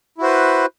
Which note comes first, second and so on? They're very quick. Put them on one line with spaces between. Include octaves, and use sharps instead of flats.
E4 F#4 C5 B4